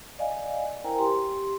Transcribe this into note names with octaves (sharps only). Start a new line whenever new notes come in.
D5 D#5 F5 G#5
E4 A#4 C5 G5 G#5 A#5
G4 C6